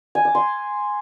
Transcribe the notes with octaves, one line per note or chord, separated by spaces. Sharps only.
G#5
D6
C6